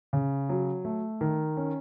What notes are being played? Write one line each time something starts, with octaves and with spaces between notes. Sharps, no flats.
C#3
F#3
A3
D#3
C#4